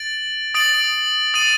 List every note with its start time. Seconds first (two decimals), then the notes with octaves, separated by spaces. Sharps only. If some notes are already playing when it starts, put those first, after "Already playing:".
Already playing: A6 D7 F#7
0.54 D#6 A6 D7 F#7
1.34 D#6 A6 D#7 F#7